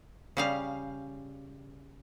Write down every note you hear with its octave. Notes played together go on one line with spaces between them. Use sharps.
C#3 G3 F5